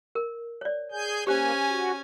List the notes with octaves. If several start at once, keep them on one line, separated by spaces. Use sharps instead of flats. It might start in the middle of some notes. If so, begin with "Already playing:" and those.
A#4
C#5 D5
G#4 G#5 G6
A#3 C#4 G4 C5 G#5
F#4